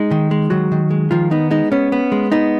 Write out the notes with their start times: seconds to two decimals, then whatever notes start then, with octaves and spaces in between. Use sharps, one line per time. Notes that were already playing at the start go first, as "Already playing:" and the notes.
Already playing: G#3 D#4
0.11 D#3
0.31 G#3
0.50 D#3 F#3 F#4
0.72 D#3
0.91 G#3
1.11 D#3 F3 F4
1.31 B3 D#4
1.51 G#3 D#4
1.72 B3 C#4
1.92 B3
2.12 G#3
2.32 B3 D#4